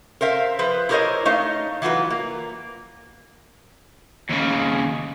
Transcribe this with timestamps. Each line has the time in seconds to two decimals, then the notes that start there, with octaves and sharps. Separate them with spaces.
0.21 A#4 C5 E5 F5
0.59 F3 B4 C5
0.89 E4 G4 A#4 C5 C#5 D#5
1.25 A3 D#4 C#5 D#5 F5
1.82 E3 F#3 F4 F#4 B4
2.10 A#3
4.30 D#2 C#3